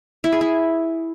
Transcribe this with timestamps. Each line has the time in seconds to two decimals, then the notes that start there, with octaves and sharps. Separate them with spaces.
0.24 E4
0.32 G#4
0.41 E4